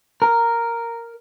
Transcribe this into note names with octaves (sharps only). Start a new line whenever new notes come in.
A#4